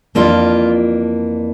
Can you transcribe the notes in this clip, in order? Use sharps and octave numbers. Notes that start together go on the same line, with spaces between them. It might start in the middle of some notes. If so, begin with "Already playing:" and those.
F2 E3 A#3 D4 F4